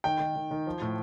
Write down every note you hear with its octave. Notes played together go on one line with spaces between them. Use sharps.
D#3 G5
D#3
D#3
D#3
F3
A2